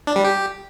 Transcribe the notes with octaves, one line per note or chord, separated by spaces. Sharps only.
D4
G3
G4